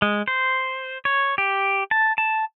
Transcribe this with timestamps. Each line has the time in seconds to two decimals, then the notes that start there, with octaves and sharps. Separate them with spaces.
0.02 G#3
0.28 C5
1.05 C#5
1.38 G4
1.91 A5
2.18 A5